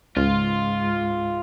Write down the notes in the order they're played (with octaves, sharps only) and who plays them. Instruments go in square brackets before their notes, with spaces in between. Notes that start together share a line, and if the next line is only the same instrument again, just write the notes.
[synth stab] C#2 [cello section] G#2 [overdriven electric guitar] F4